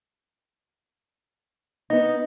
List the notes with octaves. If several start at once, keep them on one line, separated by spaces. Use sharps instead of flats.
B3 D#4 D#5